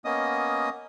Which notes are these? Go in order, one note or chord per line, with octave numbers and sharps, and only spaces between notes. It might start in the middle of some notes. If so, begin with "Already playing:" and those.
A#3 B3 C#4 D#5 D#6